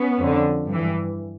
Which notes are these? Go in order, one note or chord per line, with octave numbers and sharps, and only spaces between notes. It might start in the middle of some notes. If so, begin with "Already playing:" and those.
Already playing: B3 C#4
F2 D3
G2 E3